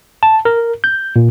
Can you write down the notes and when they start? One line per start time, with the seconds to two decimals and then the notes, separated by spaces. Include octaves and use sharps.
0.23 A5
0.45 A#4
0.84 G6
1.16 A#2